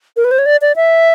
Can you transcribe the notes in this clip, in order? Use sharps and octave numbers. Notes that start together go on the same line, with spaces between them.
A#4
B4
C5
C#5
D5
D5
E5